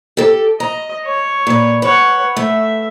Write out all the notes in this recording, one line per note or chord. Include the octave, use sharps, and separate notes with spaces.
G4 A4
D#5 A#5
C#5
A#2 B4
B4 C#5 F#5
A3 E5